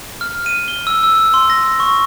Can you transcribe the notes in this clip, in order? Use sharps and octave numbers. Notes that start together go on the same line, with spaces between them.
F6
D#7
G7
E6
E6
C6
A#6
C#6